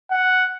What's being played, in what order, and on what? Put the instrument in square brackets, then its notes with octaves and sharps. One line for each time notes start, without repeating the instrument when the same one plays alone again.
[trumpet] F#5